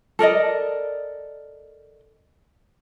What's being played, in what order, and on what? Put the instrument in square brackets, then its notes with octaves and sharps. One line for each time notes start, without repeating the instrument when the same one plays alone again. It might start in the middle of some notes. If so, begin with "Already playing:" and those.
[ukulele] A4 A#4 D5 D#5